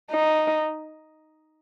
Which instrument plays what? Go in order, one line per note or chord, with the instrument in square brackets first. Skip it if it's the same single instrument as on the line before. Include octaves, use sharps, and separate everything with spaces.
[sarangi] D#4